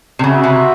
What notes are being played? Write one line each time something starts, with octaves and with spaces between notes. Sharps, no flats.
C3
C#3 F#4 B4 E5
C3